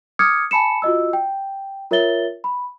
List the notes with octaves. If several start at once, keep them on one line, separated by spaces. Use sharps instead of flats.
D6 D#6 F6 G#6 C#7
G#5 A5 B5 C#7 E7
F4 F#4 D#5 E6
G5
F4 A#4 C#5 E5 A6 G7
B5